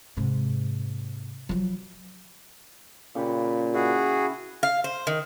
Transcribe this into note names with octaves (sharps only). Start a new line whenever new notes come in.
G#2 C3
F3 F#3
A#2 C#3 G4 B4
E4 F#4 G#4
F5
C5
D#3